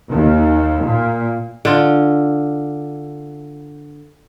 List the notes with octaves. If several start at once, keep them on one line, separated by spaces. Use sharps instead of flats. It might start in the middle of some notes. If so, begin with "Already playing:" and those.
D#2
A#2
D3 F4